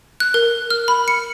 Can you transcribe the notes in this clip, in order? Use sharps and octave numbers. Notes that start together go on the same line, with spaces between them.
F#6
A#4
F6
B5
C#7